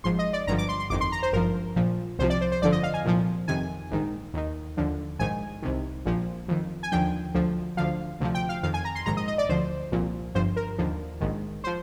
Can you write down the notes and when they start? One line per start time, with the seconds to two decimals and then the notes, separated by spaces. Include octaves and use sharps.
0.04 G#1 G#2 F3 C6
0.19 D#5
0.33 D5
0.47 G1 G2 D3 F3 A#5
0.58 D6
0.69 C6
0.79 C6
0.90 G1 F2 D#3 D6
1.01 C6
1.12 A#5
1.23 C5
1.33 G#1 G2 F3 A#4
1.76 A#1 A#2 F3
2.19 C2 C3 F3 C5
2.30 D5
2.41 C5
2.52 C5
2.62 G1 F2 D3 F3 D5
2.72 D#5
2.83 F5
2.94 G#5
3.05 C2 A#2 F3
3.48 F2 C3 D#3 G#5
3.91 A#1 G#2 D#3
4.34 D#2 D#3
4.77 D#2 D3 F3
5.19 A#1 G#2 D#3 G#5
5.62 C2 C3 D#3
6.05 A#1 A#2 F3
6.48 F2 D#3
6.83 G#5
6.92 D#2 D3 F3 G5
7.34 D2 D3 F3
7.77 D2 D3 F3 F5
8.20 D2 C3 F3
8.35 G5
8.49 F5
8.63 F2 D#3 F5
8.74 G#5
8.85 A#5
8.95 C6
9.06 A#1 G#2 D#3 A#5
9.17 D#5
9.28 D#5
9.38 D5
9.49 D2 D3 F3 C5
9.92 C2 A#2 F3
10.35 G1 G2 F3 C5
10.56 A#4
10.78 D#2 D3 F3
11.21 A#1 G#2 D#3
11.64 F3 C5